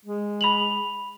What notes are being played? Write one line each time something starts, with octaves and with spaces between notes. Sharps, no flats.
G#3
B5 F7 F#7